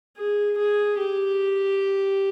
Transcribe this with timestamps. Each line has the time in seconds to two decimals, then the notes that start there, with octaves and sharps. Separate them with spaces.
0.17 G#4
0.57 G#4
0.98 G4